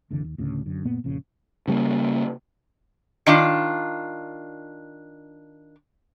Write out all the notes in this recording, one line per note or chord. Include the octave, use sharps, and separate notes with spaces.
F#1 C2 D3 E3
D#2
D2 A2 C#3
F#2 D3
F#1 A#2 A#3 B3
A#1 F2 C#3
C#3 G3 G#3 A#3
D#3 D4 F4